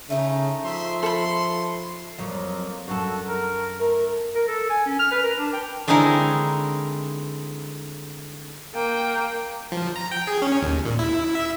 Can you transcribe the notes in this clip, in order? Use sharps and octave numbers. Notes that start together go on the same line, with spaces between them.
C#3 A3 D#4
F3 E5 C6
A4 B5 C6
F2 F#3 A#3
F#2 F#4 A4
A#4
A3 A#4
A#4
A4
G#5
C#4
F6
B4
A#4
D4
G5
D3 G#3 C4 D#4 E4 A#4
A#3 G5
F3
A#5
G5
G#4
C#4
D#2
A#2
E4
E5